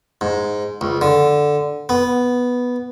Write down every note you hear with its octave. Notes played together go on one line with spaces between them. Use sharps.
G#2
C#2
D3
B3